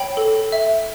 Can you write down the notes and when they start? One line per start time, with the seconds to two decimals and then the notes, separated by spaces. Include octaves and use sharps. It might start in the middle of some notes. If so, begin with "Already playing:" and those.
Already playing: C#5 G5 B5
0.17 A4
0.52 E5